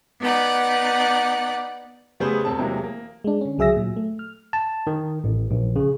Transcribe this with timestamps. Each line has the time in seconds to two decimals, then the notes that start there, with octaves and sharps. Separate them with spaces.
0.20 B3 D#4 D5 F#5
2.20 C#3 G3 A3 B3 G#4 C5
2.45 E1 C4 A5
2.59 C3 E3 F#3 G#3 A#3
2.84 A#3
3.24 G#3 D4
3.41 D3 C#4
3.58 C#2 F#3 G#4 E5 E6 A#6
3.76 A#2 F#3
3.96 A3
4.19 F6
4.53 A5
4.87 D#3
5.24 A1
5.51 A#1
5.76 C#3